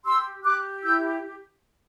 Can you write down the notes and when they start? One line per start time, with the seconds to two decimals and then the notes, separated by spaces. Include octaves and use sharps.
0.05 G4 C6 E6
0.44 G4 D6 F#6
0.83 E4 E6 G6